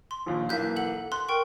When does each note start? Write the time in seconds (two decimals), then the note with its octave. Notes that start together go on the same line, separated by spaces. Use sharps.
0.11 C6
0.26 A#1 D#2 A#2
0.49 B1 E3 A#3 F#6 G6 B6
0.76 A4 F#5 F#7
1.12 C6 F#6
1.29 A#4 G5 C#6